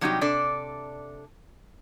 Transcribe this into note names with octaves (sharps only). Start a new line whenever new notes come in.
C3 F#3 G3 D#4 F#4 G4
C3 D4 A4 D5